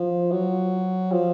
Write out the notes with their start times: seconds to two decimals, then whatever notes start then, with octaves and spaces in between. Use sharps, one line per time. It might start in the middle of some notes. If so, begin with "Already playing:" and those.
Already playing: F3
0.31 F#3
1.12 F3